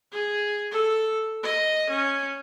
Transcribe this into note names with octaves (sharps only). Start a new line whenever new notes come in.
G#4
A4
D#5
C#4